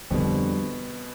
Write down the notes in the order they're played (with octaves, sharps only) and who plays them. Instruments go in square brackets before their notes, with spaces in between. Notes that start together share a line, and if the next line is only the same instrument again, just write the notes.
[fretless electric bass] F2 D3 G3 C4 [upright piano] B2